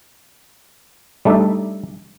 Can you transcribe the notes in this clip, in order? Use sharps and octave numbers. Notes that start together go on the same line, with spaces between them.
G3 A3 D4 D#4 D5 E5